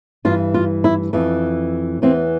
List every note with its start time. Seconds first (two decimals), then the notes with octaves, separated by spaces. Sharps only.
0.25 G2 E3 F4
0.54 F4
0.84 E4
1.13 F2 E3
2.02 E2 E3 C4